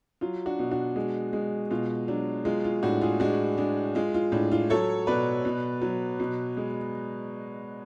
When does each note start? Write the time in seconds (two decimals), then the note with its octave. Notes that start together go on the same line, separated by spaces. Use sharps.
0.21 F#3 F4
0.46 D4 F#4
0.59 B2
0.71 D4 F#4
0.96 G#3
1.33 G#3
1.71 B2 F4
2.08 F#3 D4
2.45 G#3 F4
2.64 F4
2.83 A2 D4 F#4
3.01 F4 G#4
3.20 G#3 D4 F#4
3.58 G#3 D4
3.95 G#3 F4
4.14 F4
4.32 A2 D4
4.52 F4
4.70 F#3 A4 C#5
5.07 B2 B4 D5
5.45 B2
5.82 F#3
6.20 B2
6.57 G#3